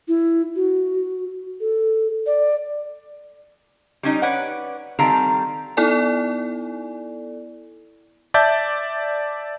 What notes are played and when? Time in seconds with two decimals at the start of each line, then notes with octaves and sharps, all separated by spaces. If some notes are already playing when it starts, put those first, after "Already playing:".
0.08 E4
0.56 F#4
1.60 A4
2.26 D5
4.03 G3 C#4 D#4
4.22 B4 C#5 D5 F#5
4.99 D#3 G3 C4 A4 F5 A#5
5.77 B3 D#4 E4 A4 D5 G#5
8.34 D5 E5 A5 G6